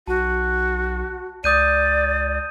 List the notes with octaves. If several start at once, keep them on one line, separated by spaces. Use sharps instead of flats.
B1 F#4 A5
C#2 D5 D#6 G6 D#7